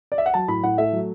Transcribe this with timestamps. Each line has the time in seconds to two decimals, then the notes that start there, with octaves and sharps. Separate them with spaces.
0.12 D5
0.18 E5
0.26 F#5
0.34 F#3 A5
0.48 A2 B5
0.63 A2 F#5
0.78 A3 E5
0.92 F#3